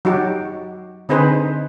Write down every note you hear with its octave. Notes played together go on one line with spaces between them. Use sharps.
F#3 D#4 F#4 G4
D3 C4 D#4 G#4 B4 C5